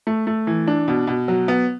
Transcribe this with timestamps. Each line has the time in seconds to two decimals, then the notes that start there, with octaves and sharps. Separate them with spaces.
0.07 A3
0.27 A3
0.47 E3
0.67 D4
0.88 B2
1.07 B2
1.28 F#3
1.48 B3